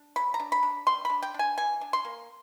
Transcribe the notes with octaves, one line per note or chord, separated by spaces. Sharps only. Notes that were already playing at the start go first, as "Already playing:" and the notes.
Already playing: D4
F#3 B5
A#5
D4
B5
D4
G3 C6
D4 B5
G5
D4
G#5
E3 G#5
D4
C6
A#3